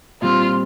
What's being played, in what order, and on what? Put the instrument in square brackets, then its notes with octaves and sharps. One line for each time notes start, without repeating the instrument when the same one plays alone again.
[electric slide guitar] A#2 G3 C4 [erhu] F4